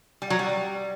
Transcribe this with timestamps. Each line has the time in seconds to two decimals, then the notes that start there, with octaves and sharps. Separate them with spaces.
0.22 G3
0.30 F#3
0.39 G3